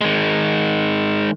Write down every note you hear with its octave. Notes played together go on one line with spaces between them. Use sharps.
D#3 G#3